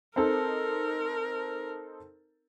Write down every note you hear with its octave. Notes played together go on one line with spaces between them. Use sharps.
C4 D#4 A4 A#4